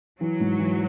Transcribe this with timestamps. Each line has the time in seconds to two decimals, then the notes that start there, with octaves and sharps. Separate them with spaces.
0.20 E3 F#3
0.40 G#2
0.59 E3